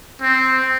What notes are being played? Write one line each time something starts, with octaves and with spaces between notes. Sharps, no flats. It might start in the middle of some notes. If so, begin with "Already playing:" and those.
C4